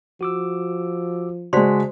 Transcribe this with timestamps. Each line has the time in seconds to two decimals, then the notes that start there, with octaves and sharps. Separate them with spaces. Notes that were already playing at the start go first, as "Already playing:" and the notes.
0.21 F3 F#4 D6 E6
1.53 C#3 G#3 F#4 C5 D5 A5 C6 B6